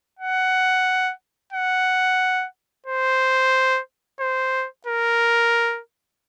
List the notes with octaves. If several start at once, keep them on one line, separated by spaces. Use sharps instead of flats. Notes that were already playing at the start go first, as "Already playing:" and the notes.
F#5
F#5
C5
C5
A#4